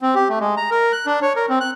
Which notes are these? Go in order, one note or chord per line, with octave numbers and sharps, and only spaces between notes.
C4
G4
A3
G#3
A#5
A#4
F#6
D4
C#5
A#4
C4
F#6